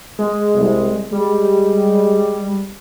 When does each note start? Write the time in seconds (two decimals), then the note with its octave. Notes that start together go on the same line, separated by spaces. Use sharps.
0.19 G#3
0.55 C2
1.12 G3 G#3